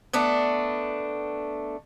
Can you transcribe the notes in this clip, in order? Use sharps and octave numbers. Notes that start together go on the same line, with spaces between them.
A3 B3 D4